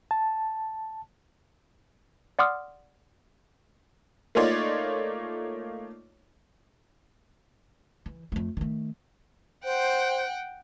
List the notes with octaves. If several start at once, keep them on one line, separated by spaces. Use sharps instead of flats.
A5
D5 F#5 C6 D6 D#6 F6
A3 A#3 D#4 F4 C#5 D5
E3
F2 A3
D#3 A3
C5 F#5 G5